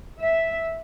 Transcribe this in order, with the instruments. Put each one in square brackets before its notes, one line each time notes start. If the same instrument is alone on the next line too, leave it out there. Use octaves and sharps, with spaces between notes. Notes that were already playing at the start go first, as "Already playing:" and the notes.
[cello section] E5